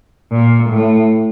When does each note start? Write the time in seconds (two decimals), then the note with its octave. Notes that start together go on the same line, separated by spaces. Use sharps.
0.31 A#2
0.70 A2